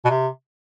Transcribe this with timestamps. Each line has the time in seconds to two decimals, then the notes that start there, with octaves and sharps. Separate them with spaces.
0.05 B2
0.10 C3